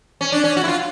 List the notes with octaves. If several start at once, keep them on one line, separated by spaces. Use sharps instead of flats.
C#4
D4
C#4
F#4
E4
F4